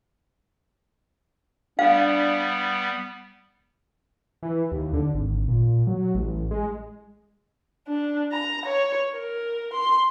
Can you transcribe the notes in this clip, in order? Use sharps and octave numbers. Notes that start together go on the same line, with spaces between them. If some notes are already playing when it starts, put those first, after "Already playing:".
G3 B3 D4 F5
E3
D#2
D3
G#1
A#2
F#3
A1
G#3
D4
A#5
C#5
A#4
C6